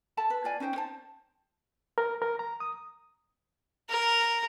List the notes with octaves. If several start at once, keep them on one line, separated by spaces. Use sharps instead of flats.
A4 A5 B5
B4
F4 D5 G#5
C#4 D#4 C5 G5
C5 A5
A#4
A#4
A#5
D#6
A#4